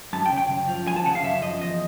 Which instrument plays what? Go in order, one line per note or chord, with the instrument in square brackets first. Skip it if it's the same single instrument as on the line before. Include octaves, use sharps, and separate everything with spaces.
[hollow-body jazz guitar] F#2 A5
G5
C#3
G5
F#2
F3
F#2 G#5
A5
C#3 F#5
F5
F#2 E5
F3 D#5
E2 D#5